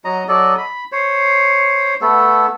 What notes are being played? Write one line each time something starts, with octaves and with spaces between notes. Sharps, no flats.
F#3 D#5 A#5
F#3 A4 D5 D#5
B5
C5 C#5
A3 B3 A4